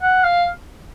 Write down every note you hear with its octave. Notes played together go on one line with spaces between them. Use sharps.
F#5
F5